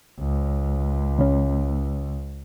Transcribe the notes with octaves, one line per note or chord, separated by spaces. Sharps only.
C#2
C#3 C#4